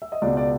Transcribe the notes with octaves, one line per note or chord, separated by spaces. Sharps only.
E5
D#5
C#2 B2 D5
D5